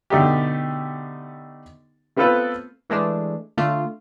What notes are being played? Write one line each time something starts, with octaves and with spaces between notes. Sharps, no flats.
B2 D3 A3 D#4 G4
A3 B3 C4 F4 A4 B4
E3 G#3 A3 D4
D3 A3 F4